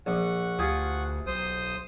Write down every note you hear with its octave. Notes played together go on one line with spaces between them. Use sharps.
A#1 F#5 C#6
D2 F4 G4 G#4
B1 C5 D#6